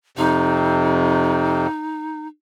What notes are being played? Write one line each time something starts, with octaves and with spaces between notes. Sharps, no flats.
F2 C3 D#4